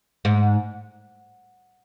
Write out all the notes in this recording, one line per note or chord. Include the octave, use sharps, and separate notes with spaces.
G#2